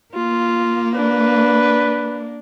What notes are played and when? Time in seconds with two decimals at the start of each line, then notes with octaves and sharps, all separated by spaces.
0.14 A#3 F4
0.95 D4 B4